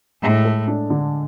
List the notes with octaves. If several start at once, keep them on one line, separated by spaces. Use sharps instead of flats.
A2 G#3
A4
D4
D3